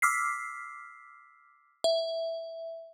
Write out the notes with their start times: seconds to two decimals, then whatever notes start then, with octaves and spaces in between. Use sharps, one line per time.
0.02 D6 E6 F6 B6 C7
1.84 E5